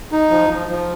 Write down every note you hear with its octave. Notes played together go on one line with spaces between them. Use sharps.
D#4
F3
F3
F3